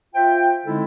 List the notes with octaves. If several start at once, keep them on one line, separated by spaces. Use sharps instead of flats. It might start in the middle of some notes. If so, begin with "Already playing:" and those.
F4 C5 E5 G5
D3 G#3 C4 D#4 E4 A4